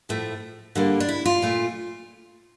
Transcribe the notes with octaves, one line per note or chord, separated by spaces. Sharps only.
A2 F3 A3
D3 G3 A#3
D4
E4
F4
A#2 A3